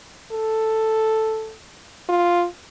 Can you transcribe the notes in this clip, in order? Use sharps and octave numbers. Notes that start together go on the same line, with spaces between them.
A4
F4